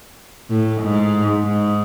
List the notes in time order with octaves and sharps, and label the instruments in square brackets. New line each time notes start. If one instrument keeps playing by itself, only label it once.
[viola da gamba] A2
G#2
G#2